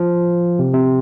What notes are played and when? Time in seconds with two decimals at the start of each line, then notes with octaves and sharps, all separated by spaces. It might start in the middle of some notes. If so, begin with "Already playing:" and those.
Already playing: F3
0.59 C3
0.74 C3